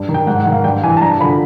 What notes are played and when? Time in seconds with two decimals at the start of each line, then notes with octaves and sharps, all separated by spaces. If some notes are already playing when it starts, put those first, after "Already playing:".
Already playing: G2
0.09 D#3
0.14 G5
0.27 G#2 F#5
0.40 F#5
0.46 D#3
0.52 F5
0.64 G2 G5
0.83 E3 G#5
0.97 A5
1.01 G2 A#5
1.20 D3 F3 B5